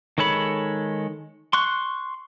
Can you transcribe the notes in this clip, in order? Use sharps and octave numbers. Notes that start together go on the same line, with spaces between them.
D#3 G#3 A4 C#5 B5
C6 C#6 F#6